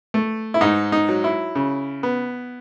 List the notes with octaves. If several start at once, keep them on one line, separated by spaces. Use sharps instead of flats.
A3
E4
G#2 D#4
D#4
F#3
E4
C#3
B3